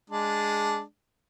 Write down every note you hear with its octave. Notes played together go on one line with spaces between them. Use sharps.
G#3 D4